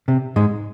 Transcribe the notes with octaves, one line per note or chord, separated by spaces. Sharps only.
C3
G#2 G#3